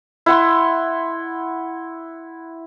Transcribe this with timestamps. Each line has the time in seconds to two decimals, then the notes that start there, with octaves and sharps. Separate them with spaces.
0.26 E4 F#5 C6